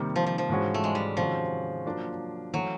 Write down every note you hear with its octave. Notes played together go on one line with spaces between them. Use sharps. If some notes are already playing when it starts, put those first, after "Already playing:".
Already playing: C3 D#3 G3 A#3
F3
F3
F3
G#2 E3 G#3 C#4 F#4
A3
G#3
G3
C3 D#3 F3 G#3 C#4 F#4
F#3 A#3 D4 F4
E3 F#3 A3 C#4